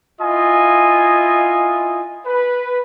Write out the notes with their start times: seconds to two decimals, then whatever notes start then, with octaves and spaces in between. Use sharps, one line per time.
0.21 E4 F4 D#5 G#5
2.26 B4